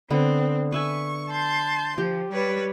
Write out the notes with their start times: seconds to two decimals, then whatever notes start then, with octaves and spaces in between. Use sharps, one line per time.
0.10 D3 B3 C4
0.72 B4 E5 G#5 C#6
1.30 A5 C6 G6
1.98 F3 G4
2.31 G3 B4 C#5